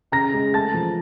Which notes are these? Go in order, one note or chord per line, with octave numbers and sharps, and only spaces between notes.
C#3 A#5 A#6
G#3
A3 A5 A6
F3